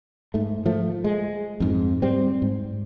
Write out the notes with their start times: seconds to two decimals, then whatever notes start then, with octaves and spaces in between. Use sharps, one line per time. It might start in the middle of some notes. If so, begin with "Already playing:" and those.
0.34 G#2 A3
0.66 F3 A3
1.04 G#3
1.60 F2 G#2
2.02 G3 C4
2.42 G#2